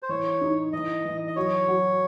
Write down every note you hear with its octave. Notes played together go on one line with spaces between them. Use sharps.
C5
E3 C#5
D#4
E3 D#5
E3
D#5
F#3 C#5
F#3